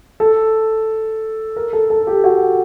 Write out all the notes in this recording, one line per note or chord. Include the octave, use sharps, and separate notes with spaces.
A4
A#4
A4
A4
G4
F#4